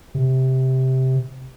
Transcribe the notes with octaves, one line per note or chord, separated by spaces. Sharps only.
C3